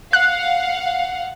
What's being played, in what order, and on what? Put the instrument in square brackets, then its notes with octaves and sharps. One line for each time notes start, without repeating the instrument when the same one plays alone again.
[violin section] F5 F#5 [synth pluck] F#6